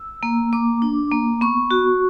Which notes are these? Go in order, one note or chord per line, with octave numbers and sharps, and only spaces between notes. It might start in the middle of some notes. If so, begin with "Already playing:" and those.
Already playing: E6
A#3
A#3 D6
D4
A#3
B3 C#6
F#4